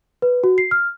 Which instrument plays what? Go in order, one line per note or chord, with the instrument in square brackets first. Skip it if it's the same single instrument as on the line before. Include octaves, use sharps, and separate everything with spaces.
[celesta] B4
F#4
C7
F6